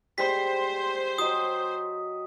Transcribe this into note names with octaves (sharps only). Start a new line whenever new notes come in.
G3 G#3 C5 B6
F#3 D#5 D#6